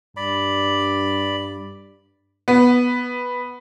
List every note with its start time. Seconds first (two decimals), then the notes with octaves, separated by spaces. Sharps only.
0.17 G2 D5 B5
2.48 B3